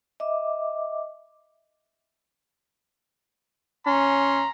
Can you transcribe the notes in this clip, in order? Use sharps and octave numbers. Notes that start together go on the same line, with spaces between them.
D#5 E5 D6
C#4 A#5 C6